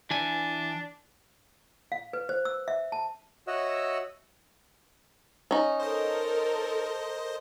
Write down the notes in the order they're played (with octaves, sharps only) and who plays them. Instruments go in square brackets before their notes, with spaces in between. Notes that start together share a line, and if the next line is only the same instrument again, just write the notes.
[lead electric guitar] E3 G#5 [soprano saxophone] D4
[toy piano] F5
B4
C5
E6
E5
A5
[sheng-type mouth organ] F#4 C#5 D#5 E5 F#5 E6
[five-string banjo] C#4 D#4
[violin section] A4 A#4 [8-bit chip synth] C5 D#5